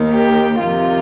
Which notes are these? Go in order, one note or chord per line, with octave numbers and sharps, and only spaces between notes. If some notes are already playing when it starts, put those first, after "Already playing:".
Already playing: D#2 D#3
G4
F2 C3 D#3 F4